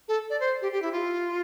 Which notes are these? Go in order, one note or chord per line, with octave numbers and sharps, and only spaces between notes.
A4
D5
C5
G4
G4
E4
F4